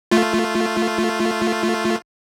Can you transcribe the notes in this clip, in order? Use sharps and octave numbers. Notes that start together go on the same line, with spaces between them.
A3 F4